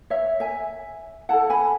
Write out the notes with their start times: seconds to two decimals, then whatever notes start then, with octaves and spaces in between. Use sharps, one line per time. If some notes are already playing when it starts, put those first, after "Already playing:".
0.10 C#5 E5
0.40 E5 G#5
1.29 E4 A4 F#5 A5
1.50 G#5 B5